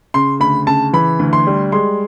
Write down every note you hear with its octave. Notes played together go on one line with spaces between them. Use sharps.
C#3 C6
D2 B5
C#3 A5
E3 B5
D2
C6
G3
G#3 C6